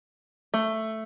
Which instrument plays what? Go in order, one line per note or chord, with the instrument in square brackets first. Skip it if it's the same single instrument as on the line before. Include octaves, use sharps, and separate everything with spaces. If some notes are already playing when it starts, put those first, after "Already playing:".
[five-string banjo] A3